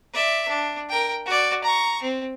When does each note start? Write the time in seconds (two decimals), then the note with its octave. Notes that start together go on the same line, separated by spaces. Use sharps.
0.13 D5 E5
0.48 D4
0.89 A#4 G5
1.26 F#4 D5
1.64 A#5 C#6
2.02 C4